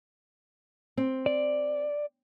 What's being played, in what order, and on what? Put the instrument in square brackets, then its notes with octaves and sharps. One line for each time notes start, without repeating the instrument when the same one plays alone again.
[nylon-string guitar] C4
[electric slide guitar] D5